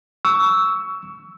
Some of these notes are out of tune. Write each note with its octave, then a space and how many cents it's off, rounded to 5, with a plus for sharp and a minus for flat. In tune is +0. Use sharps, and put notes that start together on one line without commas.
C#6 +25 E6 +0